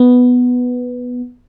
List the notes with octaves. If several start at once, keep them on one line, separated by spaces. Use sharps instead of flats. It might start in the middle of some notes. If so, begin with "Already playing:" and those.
Already playing: B3